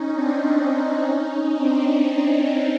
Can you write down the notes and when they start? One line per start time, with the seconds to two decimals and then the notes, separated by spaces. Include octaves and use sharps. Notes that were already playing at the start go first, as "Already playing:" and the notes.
Already playing: C#4 D#4
0.13 C4 D4
0.97 C#4 D#4
1.25 C#4 D#4
1.53 C4 D4